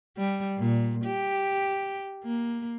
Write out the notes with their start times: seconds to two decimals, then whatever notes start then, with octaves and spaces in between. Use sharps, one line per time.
0.17 G3
0.58 A#2
1.05 G4
2.24 A#3